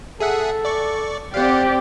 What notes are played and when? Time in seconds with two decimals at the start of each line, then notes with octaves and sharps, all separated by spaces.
0.20 G#4 A4 E5 F#5
0.65 D5 C#6
1.34 C4 G4 D5 F5 F#5